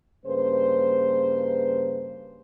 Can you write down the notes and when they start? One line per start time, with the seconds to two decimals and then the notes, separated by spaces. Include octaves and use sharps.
0.26 G2 C#3 A#3 B4 C5